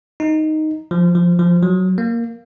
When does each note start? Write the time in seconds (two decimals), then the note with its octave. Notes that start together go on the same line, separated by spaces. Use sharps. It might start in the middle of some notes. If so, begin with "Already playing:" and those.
0.20 D#4
0.91 F3
1.15 F3
1.39 F3
1.63 F#3
1.98 A#3